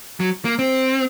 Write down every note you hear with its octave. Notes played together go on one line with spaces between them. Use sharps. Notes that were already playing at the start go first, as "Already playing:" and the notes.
F#3
A#3
C4